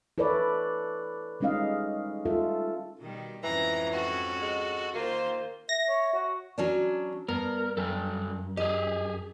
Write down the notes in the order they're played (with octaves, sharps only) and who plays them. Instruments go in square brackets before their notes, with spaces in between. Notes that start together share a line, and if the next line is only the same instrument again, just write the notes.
[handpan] E4 A4 B4 C#5 D5
G3 G#3 C#4 D#4 D#5 F5
G3 F4 A4 E5
[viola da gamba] B2 D#3 G3
[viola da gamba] F2 G#2 C#4 [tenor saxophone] E3 [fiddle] A#5
[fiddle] F#4 A4
[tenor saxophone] G#3
[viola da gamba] D#3 [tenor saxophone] A#3 [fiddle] F4 C5
[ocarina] E5 [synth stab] A#6
[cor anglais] C#5
F#4
[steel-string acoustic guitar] F#3 C#4 D4
[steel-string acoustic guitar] G2 [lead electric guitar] B3 [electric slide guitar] A#4
[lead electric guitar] F#2 [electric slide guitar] G3 A4
[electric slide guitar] G4 G#4 [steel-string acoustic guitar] D#5